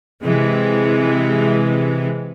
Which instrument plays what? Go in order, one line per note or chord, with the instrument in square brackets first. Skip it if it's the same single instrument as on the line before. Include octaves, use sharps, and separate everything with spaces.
[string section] C3 E3 G#3